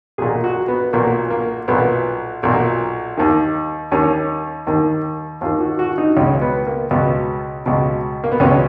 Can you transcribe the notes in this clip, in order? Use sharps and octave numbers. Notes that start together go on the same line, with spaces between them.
B1 A#2 G#4
F#4
B3
B1 A#2 A#3
A#3
B1 A#2 B3
B1 A#2
D#2 D#3
D#2 D#3 C#4
D#2 D#3
D#2 D#3 F4
F#4
F#4
D#4
C#2 B2 C#4
B3
A#3
C#2 B2 B3
C#2 B2
A#3
B3
C#2 B2 C#4